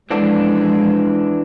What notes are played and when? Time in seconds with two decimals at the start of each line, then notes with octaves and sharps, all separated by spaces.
0.11 E3 F3 G#3 D4 A4